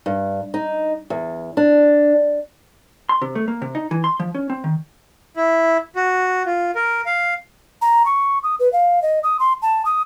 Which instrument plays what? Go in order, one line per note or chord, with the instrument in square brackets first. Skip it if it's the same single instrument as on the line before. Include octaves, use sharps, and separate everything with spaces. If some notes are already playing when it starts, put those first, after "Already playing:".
[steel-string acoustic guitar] G2
D#4
E2
D4
[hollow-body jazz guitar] C6
C3
A3
A#3
C3
D#4
E3
C6
F3
C#4
C4
D#3
[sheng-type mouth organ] E4
F#4
F4
A#4
F5
[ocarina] A#5
C#6
D#6
B4
F5
D#5
D#6
C6
A5
D#6